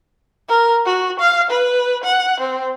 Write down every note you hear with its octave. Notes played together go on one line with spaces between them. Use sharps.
A#4
F#4
F5
B4
F#5
C4